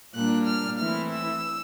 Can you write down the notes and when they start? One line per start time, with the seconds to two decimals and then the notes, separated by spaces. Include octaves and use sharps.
0.15 A#2 G3 A#3 D4 F#6
0.47 F6
0.79 E3 A3 C4 E4 F6
1.11 E6